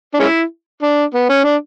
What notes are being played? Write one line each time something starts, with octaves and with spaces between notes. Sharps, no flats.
D4
G#3 C#4 E4
D4
B3
C#4
D4